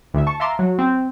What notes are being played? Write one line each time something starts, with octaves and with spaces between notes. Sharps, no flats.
D2 E4 E5
A5 C#6
E5 F5 A5 A#5 C6 D6
F#3
C4